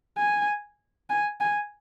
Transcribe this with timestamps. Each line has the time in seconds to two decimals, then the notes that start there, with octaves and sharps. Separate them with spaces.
0.18 G#5
1.10 G#5
1.40 G#5